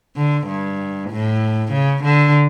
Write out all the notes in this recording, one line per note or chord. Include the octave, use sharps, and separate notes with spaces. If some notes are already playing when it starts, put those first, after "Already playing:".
D3
G2
A2
C#3
D3